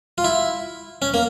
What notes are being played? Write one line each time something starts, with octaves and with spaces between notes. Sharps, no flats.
F4
E4
C#4
A#3